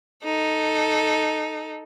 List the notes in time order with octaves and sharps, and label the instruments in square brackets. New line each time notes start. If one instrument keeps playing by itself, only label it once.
[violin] D#4 A4